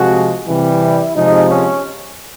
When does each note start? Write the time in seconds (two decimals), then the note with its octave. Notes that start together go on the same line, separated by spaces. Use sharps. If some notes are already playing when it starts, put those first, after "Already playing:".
Already playing: C3 F3 G#3 F#4
0.47 C3 E3 G3
0.80 E4
1.15 C3 F3 G#3 D#4
1.49 C#4